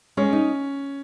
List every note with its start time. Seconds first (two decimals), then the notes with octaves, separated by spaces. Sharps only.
0.17 G#3 C#4
0.33 D#4